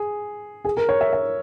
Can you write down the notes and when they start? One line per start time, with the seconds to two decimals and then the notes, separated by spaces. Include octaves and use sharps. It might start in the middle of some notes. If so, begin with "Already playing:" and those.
Already playing: G#4
0.64 G#4
0.77 A#4
0.89 C#5
1.01 E5
1.13 E5